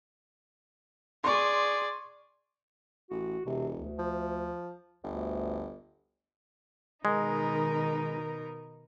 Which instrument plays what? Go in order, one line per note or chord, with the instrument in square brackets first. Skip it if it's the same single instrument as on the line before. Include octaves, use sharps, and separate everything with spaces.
[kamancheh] G#4 D5 [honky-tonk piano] C6 C#6
[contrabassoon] A1 [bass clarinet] F#4
[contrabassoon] E1 [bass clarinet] C3
[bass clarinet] D2
[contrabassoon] F3
[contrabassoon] G1 [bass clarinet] D2
[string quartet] B2 D#4 A#4 [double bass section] D#3 [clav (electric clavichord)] G#3